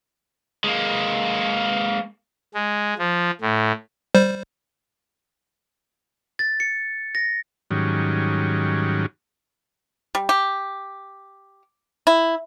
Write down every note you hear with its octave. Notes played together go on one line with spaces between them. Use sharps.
G#3 A#3
G#3
F3
A2
G3 C5
A6
C#7
A#6
G#2 D#3 F#3 G3 C#4
G3
G4
E4